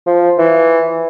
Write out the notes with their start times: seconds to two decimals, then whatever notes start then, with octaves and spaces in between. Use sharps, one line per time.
0.06 F3
0.38 E3